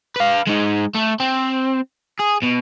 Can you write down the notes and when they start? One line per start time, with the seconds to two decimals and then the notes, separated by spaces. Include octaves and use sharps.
0.16 B4 F5
0.47 G#3 D#4
0.95 A3
1.20 C4
2.19 G#4
2.42 B2